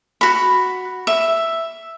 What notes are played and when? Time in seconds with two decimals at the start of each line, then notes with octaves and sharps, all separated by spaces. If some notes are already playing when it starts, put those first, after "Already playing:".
0.21 F#4 B5
1.07 E5